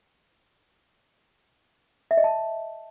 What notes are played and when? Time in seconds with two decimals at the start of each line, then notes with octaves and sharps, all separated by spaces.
2.11 E5
2.17 D#5
2.24 A5